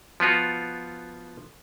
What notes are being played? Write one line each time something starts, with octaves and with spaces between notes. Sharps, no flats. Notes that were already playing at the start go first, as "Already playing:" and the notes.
F3 B3 F4 F#4